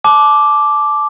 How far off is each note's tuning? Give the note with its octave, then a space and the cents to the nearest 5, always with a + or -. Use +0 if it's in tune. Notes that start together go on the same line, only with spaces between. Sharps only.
A5 -30 D6 +0